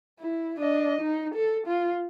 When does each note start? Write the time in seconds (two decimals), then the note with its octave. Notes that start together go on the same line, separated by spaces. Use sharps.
0.20 E4
0.60 D4 D#5
1.00 D#4
1.34 A4
1.67 F4